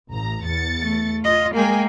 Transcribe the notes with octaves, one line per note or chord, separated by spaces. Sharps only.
A1 A#5
E2 A6 C#7
A3
F4 D#5
G#3 A#3 A#4 G5 G#5